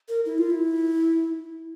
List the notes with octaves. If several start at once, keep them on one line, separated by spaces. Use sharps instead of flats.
A#4
E4
F4
E4